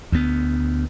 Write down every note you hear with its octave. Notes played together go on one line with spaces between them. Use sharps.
D2 B3